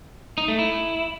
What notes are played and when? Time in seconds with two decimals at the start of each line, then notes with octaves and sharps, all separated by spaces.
0.38 D#4
0.48 A3
0.59 E4